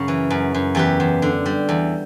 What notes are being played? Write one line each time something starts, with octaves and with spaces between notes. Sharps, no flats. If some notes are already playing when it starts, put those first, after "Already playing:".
Already playing: F#2 C#3
E3
F#2
F#2
E2 G4 B4
E2
D3
G3
E2